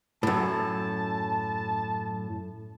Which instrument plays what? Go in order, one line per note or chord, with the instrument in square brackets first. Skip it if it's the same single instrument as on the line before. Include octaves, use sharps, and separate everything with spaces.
[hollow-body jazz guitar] F#2 A2 [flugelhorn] A5